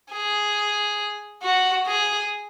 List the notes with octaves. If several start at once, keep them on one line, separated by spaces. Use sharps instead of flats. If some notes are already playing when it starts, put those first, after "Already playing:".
G#4
F#4
G#4